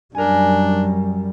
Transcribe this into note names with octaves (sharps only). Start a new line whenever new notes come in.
F#2 G3 D4 A#4 G#5